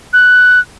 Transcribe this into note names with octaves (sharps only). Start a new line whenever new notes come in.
F#6